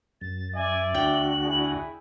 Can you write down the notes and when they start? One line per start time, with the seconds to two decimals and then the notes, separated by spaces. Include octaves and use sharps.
0.21 F#2 A6
0.55 D5 E5 G#5
0.95 D2 D4 F#4 G5 F#7
1.44 E4 G#4